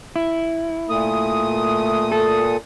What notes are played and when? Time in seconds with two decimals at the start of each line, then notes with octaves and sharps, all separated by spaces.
0.16 E4
0.90 A#2 A3 D#6
2.12 A4